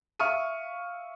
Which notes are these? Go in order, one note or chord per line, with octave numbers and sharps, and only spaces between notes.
E5 F5 C#6 D#6 F6 D#7